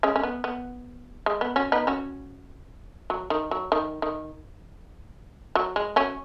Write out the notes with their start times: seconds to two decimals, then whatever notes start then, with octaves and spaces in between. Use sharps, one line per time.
0.03 G#3 C#4
0.16 C#4
0.23 B3
0.44 B3
1.26 G#3
1.41 B3
1.56 C#4 F#4
1.72 B3 D#4
1.87 C#4 F#4
3.10 F#3
3.30 D#3
3.51 F#3
3.72 D#3
4.02 D#3
5.55 F#3
5.76 G#3
5.96 C#4 F#4